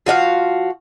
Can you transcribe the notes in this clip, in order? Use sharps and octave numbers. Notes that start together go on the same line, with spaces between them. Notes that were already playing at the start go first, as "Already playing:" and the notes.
F3 F#4 D#5 F5